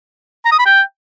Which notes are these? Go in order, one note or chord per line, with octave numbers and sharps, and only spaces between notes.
A#5
D#6
B5
G5